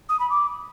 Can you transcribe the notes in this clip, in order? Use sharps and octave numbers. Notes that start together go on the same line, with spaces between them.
D#6
B5
D6